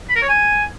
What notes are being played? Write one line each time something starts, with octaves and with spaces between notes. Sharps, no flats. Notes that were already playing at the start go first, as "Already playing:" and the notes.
B5
A#4
C#5
G#5